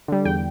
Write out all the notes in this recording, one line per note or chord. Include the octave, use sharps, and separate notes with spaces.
D3 G3
E2 G5